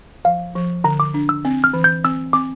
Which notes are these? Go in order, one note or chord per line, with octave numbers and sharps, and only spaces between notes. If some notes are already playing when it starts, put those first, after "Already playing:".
F3 F5
F3
D3 A#5
D6
D4
E6
C4
F6
E3
G6
C4 E6
C4 D6